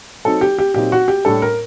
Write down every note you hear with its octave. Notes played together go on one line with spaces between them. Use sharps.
F#3 C4 D#4 A4
G4
G4
A#2 F#3 C4 D#4 G4
F#4
G4
A2 G3 D4 A4
A#4